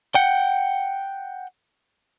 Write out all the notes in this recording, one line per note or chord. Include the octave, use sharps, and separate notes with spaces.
F#5 G5